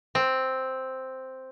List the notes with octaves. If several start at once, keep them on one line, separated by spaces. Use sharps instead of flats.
C4